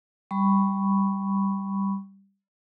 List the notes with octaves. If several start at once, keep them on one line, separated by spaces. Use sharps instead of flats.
G3 B5 C#6